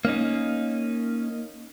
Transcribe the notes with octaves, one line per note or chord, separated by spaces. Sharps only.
A#3 C#4 D#4